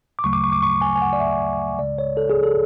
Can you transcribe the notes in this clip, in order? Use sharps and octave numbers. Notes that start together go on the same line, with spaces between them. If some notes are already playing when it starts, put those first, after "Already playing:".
D6
D2 C#3 F#3 A3 C#6
D6
C#6
D6
C#6
G#5
G#5
F#5
D5
E5
C#2 C#3 G#3 D5
C#5
A4
G#4
A4